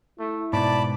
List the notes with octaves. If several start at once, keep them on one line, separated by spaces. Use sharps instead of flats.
A3 E4
G#2 B2 D5 A5 B5 D6